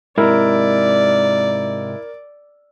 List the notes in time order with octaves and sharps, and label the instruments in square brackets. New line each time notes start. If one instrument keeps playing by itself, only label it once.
[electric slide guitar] G#2 C3 [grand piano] E4 [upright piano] A#4 [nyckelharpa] D5